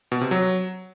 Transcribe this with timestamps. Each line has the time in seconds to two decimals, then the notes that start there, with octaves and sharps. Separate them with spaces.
0.12 B2
0.21 C3
0.31 F#3